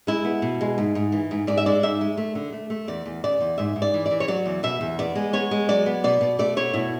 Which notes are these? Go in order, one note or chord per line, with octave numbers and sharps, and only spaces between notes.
G#3 E4
B3
B2
G#3
G#2
G#2
E3
G#2
G#2 D5
E5
G#3 D5
G#2 E5
G#3
A3
D3
A3
A3
E2 D5
E2
C#3 D5
E2
G#2 E5
G#2
D5
E3
D5
E3
C#5
F#3 D5
E2
B2 E5
E2
B3 D5
G#3
B3 C#5
G#3
F#3 D5
B3
B2 D5
B2
A3 D5
B2 C#5
B2 E4